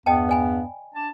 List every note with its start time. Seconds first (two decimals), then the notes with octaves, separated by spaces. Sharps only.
0.06 E2 G2 B3 D#5 G5 A5
0.29 D5 G#5 B5
0.95 D4 A5